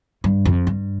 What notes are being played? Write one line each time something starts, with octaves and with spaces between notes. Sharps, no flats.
G2
F2
G2